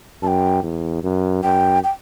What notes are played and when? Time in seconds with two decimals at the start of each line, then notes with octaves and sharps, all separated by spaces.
0.22 F#2 A5
0.27 G5
0.63 E2
1.03 F#2
1.43 F#2 G5
1.84 G5